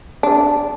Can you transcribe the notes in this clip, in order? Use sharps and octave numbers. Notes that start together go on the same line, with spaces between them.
D4